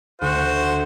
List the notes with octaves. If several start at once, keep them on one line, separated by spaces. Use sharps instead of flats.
D2 F#4 C5